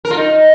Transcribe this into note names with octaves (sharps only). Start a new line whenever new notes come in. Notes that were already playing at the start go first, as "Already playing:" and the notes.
A#4
F4
D#4